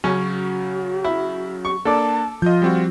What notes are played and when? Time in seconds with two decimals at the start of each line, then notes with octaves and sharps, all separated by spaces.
0.04 C#3 F#3 C#4 F#4
1.04 E4
1.65 C#6
1.85 A#3 D4 A4 D5 A5
2.42 F3 F4 D#5 G6
2.62 G3 C4 F#4